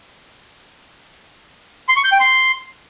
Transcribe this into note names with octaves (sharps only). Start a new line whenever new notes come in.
C6
C#6
G6
G5
C6